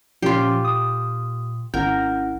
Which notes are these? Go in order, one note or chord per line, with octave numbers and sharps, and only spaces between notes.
A#2 F3 C#4 F4 G4 C6
D#6
G#1 C#4 E4 A#4 F#5 G6